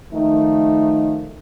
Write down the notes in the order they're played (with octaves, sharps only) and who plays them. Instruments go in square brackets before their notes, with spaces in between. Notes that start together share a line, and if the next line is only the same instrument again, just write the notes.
[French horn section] D#3 F3 A3 D#4